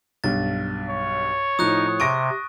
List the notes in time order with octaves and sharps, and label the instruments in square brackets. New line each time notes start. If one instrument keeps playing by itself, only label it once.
[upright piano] B1 G2 [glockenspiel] A6
[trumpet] C#5
[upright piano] A2 F3 [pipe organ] D#4 [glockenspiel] D#6 F#6
[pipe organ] C3 [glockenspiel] C#6 [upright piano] A#6 D7 D#7